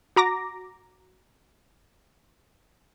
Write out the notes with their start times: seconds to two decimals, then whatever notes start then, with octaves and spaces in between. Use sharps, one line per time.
0.16 F#4 A#5 D6 A#6